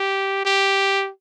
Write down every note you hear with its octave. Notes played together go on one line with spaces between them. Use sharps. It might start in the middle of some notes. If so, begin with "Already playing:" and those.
Already playing: G4
G4